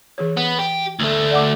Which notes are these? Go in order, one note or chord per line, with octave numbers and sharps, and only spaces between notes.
E3 G#4 C#5
B3
G4
D2 A3
D5 F#5 D6